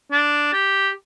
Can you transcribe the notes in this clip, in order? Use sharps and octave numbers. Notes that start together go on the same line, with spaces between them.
D4
G4